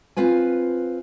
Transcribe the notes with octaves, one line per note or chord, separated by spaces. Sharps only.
C4 F4 B4 G#5